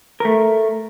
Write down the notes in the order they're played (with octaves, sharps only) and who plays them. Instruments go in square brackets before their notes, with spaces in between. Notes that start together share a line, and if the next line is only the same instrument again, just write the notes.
[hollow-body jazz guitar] A3 A#4